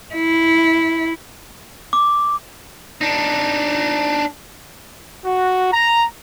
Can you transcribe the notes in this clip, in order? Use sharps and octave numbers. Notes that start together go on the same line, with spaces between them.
E4
D6
D4 D#4
F#4
A#5